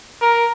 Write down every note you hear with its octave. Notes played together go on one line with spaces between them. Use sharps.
A#4